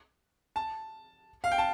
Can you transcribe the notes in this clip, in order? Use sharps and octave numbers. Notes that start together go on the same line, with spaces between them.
A5
F5
G5
A5